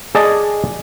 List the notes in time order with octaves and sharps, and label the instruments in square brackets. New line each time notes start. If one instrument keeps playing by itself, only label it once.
[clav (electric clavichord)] G#4 D5 D#5 A5